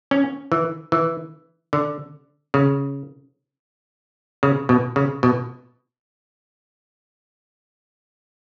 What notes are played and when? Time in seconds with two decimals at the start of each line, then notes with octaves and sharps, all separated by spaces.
0.11 C#4
0.52 E3
0.92 E3
1.73 D3
2.54 C#3
4.43 C#3
4.69 B2
4.96 C#3
5.23 B2